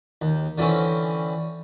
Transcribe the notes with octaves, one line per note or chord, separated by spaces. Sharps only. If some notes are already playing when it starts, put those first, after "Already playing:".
D#2
D3 E3 C4 C#4